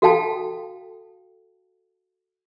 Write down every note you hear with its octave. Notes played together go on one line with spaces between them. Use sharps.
F#4 A4 F5 G5 A5